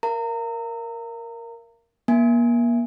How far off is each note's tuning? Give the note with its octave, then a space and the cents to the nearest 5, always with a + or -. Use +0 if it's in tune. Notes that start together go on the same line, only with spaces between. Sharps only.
A#4 +0 F5 -45 A#5 -30
A#3 +35 G#5 +0